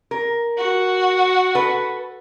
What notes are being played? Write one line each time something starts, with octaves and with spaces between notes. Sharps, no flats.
A#4
F#4
A4 B4